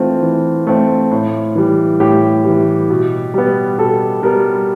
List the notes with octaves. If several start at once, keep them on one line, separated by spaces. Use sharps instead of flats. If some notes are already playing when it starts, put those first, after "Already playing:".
Already playing: E3 A3 C4 F4
E3
A3 C4
A2
E3 G3
A2 G4
E3 G3
B2
G3 B3
B2 A4
G3 B3 A#4